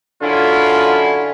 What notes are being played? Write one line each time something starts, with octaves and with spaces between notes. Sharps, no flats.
F#2 D3 C#4 E4 F4